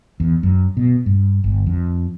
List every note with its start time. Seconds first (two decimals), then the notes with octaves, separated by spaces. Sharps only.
0.20 E2
0.43 F#2
0.77 B2
1.06 G2
1.44 G1
1.66 F2